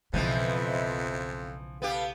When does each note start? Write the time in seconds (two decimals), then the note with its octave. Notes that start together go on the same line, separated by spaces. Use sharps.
0.14 B1 F2 C#3 E3 F3 B4 D#5 E5
1.82 B3 G4 A4 B4 F5